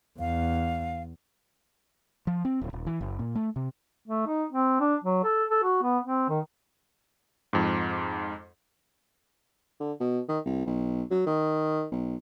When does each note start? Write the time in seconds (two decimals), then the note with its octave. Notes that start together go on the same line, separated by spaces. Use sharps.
0.19 E2 F5
2.27 F3
2.45 C4
2.61 D1
2.73 D#1
2.86 E3
3.01 F#1
3.19 A#2
3.35 A3
3.56 C3
4.08 A3
4.26 D#4
4.52 C4
4.80 D4
5.04 F#3
5.24 A4
5.50 A4
5.63 F#4
5.83 B3
6.04 C4
6.29 D#3
7.53 F2 G#2
9.80 D3
10.00 B2
10.29 D#3
10.46 C2
10.66 B1
11.11 F#3
11.26 D#3
11.92 B1